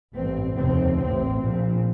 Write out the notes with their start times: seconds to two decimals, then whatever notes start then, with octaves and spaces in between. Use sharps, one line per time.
0.15 A1 G2 C4
0.57 F1 D#2 C#3 C4
0.99 A1 A2 C4
1.40 A#1 A#2 C4